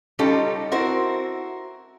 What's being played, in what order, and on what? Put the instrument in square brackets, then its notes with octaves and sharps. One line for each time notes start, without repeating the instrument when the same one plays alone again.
[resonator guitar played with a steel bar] G3 C#4 D#4 F4 G4 A4
C4 E4 F#4 A#4 C5